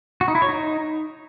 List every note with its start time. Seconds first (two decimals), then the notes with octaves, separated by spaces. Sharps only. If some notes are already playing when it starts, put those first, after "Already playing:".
0.21 F#4
0.28 D#4
0.35 E4
0.42 C#5
0.49 D#4